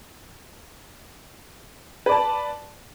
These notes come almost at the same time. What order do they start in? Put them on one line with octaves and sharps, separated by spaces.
B4 D5 A5